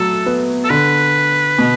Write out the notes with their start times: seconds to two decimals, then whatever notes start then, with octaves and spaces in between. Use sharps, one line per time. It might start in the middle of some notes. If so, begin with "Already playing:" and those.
Already playing: F#3 A3 A4
0.26 B3
0.64 A4
0.70 D3 B4
1.58 B2